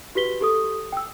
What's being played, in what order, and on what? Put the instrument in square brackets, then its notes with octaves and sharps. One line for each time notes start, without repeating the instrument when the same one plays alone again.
[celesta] F#4 G4 B4 B6 G7
G4 A4 D#6
G5 E6